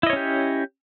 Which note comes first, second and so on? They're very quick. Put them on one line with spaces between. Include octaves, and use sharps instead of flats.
E4 D#5 C#5 C#4 G4